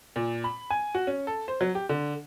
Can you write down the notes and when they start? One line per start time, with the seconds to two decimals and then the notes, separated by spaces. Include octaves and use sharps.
0.16 A#2
0.44 B5
0.70 G#5
0.95 F#4
1.07 C#4
1.27 A4
1.48 C5
1.61 F#3
1.75 G4
1.89 D3